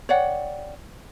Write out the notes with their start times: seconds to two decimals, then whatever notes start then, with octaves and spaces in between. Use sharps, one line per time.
0.09 C#5 D5 F#5 G5